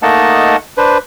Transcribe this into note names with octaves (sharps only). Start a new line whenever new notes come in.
A3 A#3 D#4 D#5 F#5 A5
D4 B4 C5